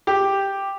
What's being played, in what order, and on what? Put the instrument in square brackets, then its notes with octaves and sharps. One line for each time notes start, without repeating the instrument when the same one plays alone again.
[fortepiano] G4